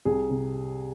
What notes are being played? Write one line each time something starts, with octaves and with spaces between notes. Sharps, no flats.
C2 G#4
C3